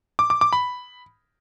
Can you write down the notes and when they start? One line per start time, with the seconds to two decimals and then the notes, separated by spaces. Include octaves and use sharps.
0.19 D6
0.30 D6
0.41 D6
0.53 B5